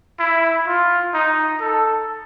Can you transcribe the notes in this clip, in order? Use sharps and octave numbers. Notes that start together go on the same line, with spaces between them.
E4
F4
D#4
A4